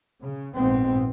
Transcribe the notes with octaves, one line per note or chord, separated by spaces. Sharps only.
C#3
A#1 G#2 B3 C4